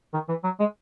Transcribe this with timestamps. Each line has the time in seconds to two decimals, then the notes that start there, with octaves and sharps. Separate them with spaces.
0.14 D#3
0.28 E3
0.44 F#3
0.60 G#3